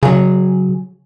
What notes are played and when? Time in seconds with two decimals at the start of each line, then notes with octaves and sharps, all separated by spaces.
0.03 C#3 F#3 G#4